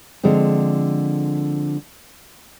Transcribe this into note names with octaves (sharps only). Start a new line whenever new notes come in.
D3 F3 G#3 C4